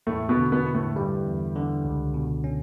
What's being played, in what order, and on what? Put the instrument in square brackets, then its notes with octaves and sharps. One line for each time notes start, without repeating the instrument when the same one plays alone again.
[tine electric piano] E2 [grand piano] A2 A3
[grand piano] B2 B3
[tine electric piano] D3
[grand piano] B2 B3
[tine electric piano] E4
[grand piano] A2 A3
[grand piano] G2 G3 [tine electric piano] A3
[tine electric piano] E2
D3
C#2
B2
C#4